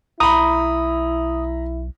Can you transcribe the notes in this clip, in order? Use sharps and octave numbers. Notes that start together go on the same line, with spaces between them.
B1 E4 A#5 B5 D#6